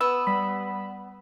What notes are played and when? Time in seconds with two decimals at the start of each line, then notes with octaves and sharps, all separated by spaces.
0.01 B3 E6
0.27 G3 B5